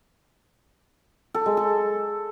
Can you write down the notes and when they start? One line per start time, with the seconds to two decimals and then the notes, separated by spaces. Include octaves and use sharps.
1.34 A4
1.46 G#3
1.57 A4